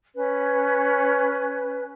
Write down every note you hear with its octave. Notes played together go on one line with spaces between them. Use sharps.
C#4 B4